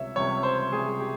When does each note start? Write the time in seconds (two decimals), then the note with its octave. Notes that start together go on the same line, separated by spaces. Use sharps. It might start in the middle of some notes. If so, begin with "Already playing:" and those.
Already playing: C#2 C3 G3 C#5 E5
0.16 C#2 C3 G3 C#5
0.43 C5
0.71 C#2 C3 G3 G#4
1.00 G4